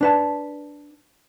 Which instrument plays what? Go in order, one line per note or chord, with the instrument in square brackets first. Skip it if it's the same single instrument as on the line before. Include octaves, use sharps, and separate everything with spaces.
[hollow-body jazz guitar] D4 B4 A5